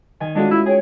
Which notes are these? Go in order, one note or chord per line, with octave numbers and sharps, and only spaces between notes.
D#3 G#5
G#3 A3 C#4 D4 F4 F#4
E4
G#4 C#5 G5